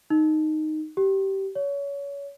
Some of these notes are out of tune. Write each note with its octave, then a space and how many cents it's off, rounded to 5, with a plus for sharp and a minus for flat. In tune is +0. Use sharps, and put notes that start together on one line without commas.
D#4 -5
G4 -20
C#5 +25